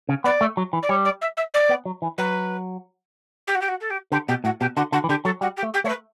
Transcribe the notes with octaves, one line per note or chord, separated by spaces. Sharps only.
C#3
B3 D5
A3
F#3
E3
D5
G3 C#5
D5
E5
E5
D5
B3
F#3
E3
F#3 B4
G4
F#4
G4
F#4
A4
G4
D3 G4
B2 G4
A2 F#4
B2 G4
D3 F#4
D3 F#4
E3
D3 G4
F#3 A4
G3 F#4
G4
A3
G4
A3 C#5
B4